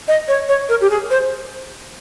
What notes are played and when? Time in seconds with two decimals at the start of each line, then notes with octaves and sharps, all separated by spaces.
0.08 D#5
0.28 C#5
0.49 C#5
0.69 A#4
0.81 G4
0.90 G#4
1.10 C5